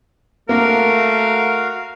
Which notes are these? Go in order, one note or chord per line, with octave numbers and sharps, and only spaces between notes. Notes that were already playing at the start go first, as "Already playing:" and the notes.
A3 A#3 F#4 A#4 F5